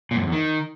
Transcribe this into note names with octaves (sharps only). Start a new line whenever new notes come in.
A#2
F#2
F2
E2
D#3